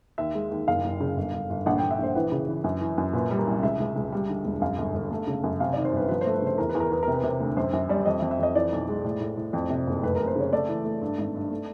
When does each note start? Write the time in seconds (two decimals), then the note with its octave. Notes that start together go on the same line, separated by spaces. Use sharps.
0.18 D#2 E5
0.35 G#3
0.51 D#2
0.68 F#1 F5
0.84 F#1
1.00 C#3
1.17 G1
1.33 G1
1.50 G1
1.66 A#1 F#5
1.78 A#1 G5
1.91 E5
1.98 A#1 C5
2.15 E3 B4
2.32 C#3
2.48 E3
2.64 F#2
2.81 E3
2.98 F#2
3.13 A#2 B4
3.31 G3
3.39 A#4
3.46 C2
3.63 C#2 E5
3.80 C#2
3.96 C#2
4.12 G3
4.29 D3
4.45 E1
4.61 F#2 F5
4.78 G1
4.94 G1
5.11 A3
5.27 C#3
5.44 F#2
5.60 C3 F5
5.73 D#3 D5
5.85 C5
5.93 G1 B4
6.09 F3 B4
6.21 A3 C5
6.34 B4
6.42 C#3 C5
6.58 E2 A#4
6.69 B4
6.75 E2
6.80 A#4
6.91 E2 B4
7.03 C3 A#4
7.14 B4
7.24 C3 A#4
7.40 D2
7.56 F#2 C5
7.73 F#2
7.89 G3 D5
8.06 F2 D#5
8.19 F2 E5
8.31 E5
8.39 F2 D#5
8.55 E3 D5
8.72 B1
8.88 G#3
9.04 A2
9.20 A2
9.37 A2
9.53 F2
9.70 C3
9.87 F#1
10.03 F1 B4
10.16 F1 A#4
10.27 C5
10.36 C#3 C#5
10.52 A3 D5
10.69 E3
10.85 A3
11.01 G2
11.18 G#1
11.35 G2
11.50 A3